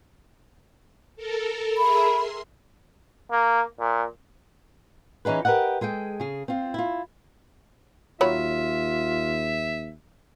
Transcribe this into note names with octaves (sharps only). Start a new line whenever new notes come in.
A4 A#4
G#4 A#4 E5 B5
C6
A#3
A#2
E3 C#4 D#4 G#4 B4
G4 A#4 B4 D#5 F#5
G#3 G#4 A4 G5
C#3 G#4
C4 F4
E4 F4
D#2 F#3 F4 C#5 E5 B5